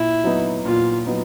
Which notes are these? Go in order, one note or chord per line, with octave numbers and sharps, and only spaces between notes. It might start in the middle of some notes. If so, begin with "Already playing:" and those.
Already playing: A#2 E4
F#3 B3 D#4
A#2 F4
F#3 B3 D#4